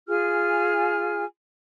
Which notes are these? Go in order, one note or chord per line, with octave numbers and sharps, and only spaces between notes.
F4 G#4 G#5 F6